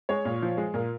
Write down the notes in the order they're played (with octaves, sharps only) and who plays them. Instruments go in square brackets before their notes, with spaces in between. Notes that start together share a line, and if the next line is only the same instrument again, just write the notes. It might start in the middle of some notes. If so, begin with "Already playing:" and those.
[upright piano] G#3 C#5
A#2
F3
G#3
A#2 A#4